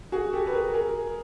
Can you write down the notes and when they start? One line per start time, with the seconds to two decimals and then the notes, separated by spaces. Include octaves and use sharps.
0.12 F#4 G#4
0.33 G4 A4
0.47 B4
0.53 G#4 A#4
0.74 G#4 A#4